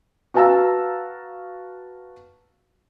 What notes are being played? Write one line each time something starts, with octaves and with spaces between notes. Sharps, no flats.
F#4 B4 F5 A5 A#5 E6